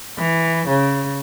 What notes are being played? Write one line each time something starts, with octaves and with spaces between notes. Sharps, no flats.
E3
C#3